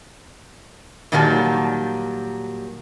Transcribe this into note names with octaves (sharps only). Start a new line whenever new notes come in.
A#2 D#3 F#3 G3 A#4 A5